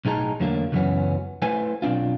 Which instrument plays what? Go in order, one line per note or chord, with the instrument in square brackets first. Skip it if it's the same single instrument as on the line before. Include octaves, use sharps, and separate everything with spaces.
[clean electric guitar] B1 A2 D#4 G#4 A5 A#5
E2 D3 F#3 A3 A#3
C#2 F#2 E3 F#3 B3 C#4
A3 E4 B4 C5 G#5
B1 C4 D4 F4